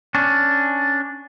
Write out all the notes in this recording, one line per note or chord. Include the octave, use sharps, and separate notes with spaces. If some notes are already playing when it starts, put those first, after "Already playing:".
C#4 D4